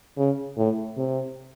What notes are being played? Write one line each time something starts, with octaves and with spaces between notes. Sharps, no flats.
C#3
A2
C3